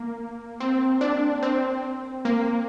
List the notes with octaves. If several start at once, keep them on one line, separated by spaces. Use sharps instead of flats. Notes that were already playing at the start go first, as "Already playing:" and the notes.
Already playing: A#3
C4
D4
C4
A#3